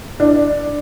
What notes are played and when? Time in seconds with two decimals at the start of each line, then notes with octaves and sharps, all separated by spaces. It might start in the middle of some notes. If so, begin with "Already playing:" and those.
0.20 D4